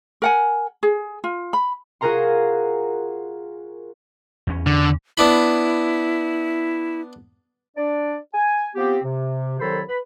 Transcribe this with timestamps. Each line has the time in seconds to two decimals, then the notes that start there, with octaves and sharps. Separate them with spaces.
0.22 A#4 F#5 G#5
0.83 G#4
1.24 F4
1.53 B5
2.01 F4 F#4 G#4 A#4 A#5 C6
4.47 E2 C#4
4.66 D3
5.17 B3 D4 E4 B5
7.77 D4 D5
8.34 G#5
8.75 F3 B3 C4 G4
9.03 C3
9.60 C2 D#3 F#3 A4 C5 B5
9.87 B4 B5